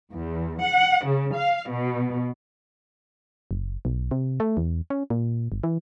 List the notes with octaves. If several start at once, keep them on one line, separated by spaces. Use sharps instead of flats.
E2
F#5
C#3
F5
B2
F#1
B1
C3
A3
E2
C#4
A#2
G1
E3